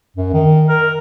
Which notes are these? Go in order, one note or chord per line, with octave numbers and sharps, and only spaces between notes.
F#2
D#3
A#4